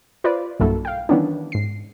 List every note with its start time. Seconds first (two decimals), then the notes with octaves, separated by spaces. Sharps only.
0.24 F4 B4 C5 D5
0.60 B1 G2 A#3 E4 F#4 A4
0.85 F5 G5
1.09 D#3 E3 G3 B3 C#4 D4
1.52 G#2 C7